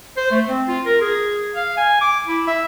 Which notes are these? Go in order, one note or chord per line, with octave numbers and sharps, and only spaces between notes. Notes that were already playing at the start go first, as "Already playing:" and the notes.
C5
A3
C4
F4
A#4
G#4
F5
G#5
D6
E4
E5